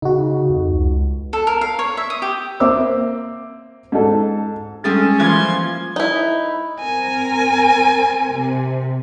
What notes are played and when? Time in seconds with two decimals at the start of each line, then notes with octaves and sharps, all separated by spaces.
0.02 C#3 D#4 F#4
0.50 F2
0.72 C#2
1.33 A4
1.47 A#4
1.61 F5
1.79 C#5
1.97 E5
2.10 D#6
2.22 G4
2.60 A#3 C4 E5 D6 E6
3.92 G#2 A4
4.84 G3 G#3 C4 C#4 G#4 A4 A6
5.19 E3 F3 A#3 C6 G#6
5.96 D#4 E4
6.79 C4 A#4 G#5
8.33 C3